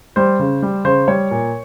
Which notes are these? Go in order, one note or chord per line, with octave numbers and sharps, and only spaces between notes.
G3 C5
C#3
G3
C#3 C5
G3 C#5
A#2